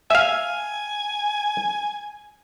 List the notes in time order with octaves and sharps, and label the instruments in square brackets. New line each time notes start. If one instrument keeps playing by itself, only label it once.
[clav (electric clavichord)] E5 F5 [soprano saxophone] G#5